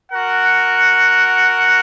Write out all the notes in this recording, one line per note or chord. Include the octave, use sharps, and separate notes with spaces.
F#4 A#4 F#5